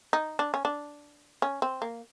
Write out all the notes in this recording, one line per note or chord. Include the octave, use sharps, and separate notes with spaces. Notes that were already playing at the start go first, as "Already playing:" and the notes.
D#4
D4
C#4
D4
C#4
C4
A#3